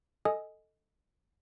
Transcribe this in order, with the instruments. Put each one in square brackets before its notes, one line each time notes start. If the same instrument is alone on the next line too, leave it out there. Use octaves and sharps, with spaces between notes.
[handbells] A4 D#5 G#5 D#6